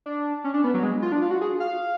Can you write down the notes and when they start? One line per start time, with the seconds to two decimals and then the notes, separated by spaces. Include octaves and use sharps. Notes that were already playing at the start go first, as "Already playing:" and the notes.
0.06 D4
0.44 C#4
0.54 D4
0.64 B3
0.74 F#3
0.83 G#3
1.02 F4
1.12 D4
1.22 F4
1.31 F#4
1.41 G#4
1.60 F5